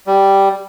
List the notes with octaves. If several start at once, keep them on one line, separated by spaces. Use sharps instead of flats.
G3